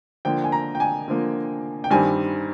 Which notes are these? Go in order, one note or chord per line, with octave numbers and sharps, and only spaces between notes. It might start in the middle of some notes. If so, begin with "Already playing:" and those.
D3 F3 A#3 G5
G#5
A#5
G5
G#5
D3 F3 A#3
G5
G2 D#3 G3 C4 G#5